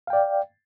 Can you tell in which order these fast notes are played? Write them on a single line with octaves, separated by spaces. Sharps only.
F5 G5 D5